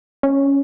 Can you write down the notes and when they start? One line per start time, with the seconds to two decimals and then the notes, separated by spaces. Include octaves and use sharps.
0.23 C#4